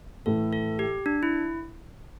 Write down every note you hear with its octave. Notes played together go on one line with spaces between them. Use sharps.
A2 E3 A3 A4
A4
G4
D4
E4